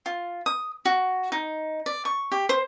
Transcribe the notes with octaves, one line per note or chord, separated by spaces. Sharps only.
F4
D#6
F#4
D#4
D5
C#6
G4
C5